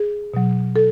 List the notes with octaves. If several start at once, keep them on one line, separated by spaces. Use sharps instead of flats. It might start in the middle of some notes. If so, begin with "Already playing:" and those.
Already playing: G#4
B2 F#3
A4